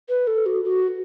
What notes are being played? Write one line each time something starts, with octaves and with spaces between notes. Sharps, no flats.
B4
A4
F#4
F#4